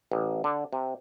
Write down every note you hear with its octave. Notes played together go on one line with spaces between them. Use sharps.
A1
D3
C3